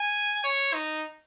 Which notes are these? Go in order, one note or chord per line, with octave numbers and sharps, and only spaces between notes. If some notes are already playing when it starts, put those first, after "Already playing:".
Already playing: G#5
C#5
D#4